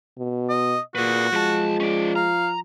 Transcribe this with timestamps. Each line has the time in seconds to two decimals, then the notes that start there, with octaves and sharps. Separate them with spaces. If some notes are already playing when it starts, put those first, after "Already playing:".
0.18 B2
0.49 D#5
0.95 A#2 F#4 G#4 B4
1.33 B1 F3 G#3 A5
1.80 C#4 D5
2.16 F5 A#5